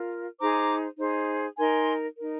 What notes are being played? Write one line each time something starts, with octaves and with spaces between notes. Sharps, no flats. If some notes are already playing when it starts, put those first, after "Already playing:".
Already playing: F4 A#4
D#4 G#4 C5 A#5 D6
D#4 G#4 C5
D#4 A#4 G#5 C6
D#4 A#4